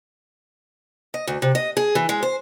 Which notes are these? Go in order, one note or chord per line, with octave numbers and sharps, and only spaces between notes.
D#5
D2
C3
D#5
G#4
E3
G#3
C5